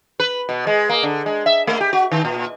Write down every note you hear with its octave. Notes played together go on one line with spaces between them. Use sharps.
B4
B2
G#3
A#3
D3
G#3
E5
A3
G4
F#4
D#3
A#2